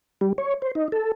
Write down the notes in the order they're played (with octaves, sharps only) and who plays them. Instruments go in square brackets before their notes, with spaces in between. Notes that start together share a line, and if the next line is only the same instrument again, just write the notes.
[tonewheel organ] G3
C#5
C5
D#4
A4